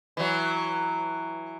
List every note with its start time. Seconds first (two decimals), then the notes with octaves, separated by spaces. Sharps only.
0.17 E3 F#3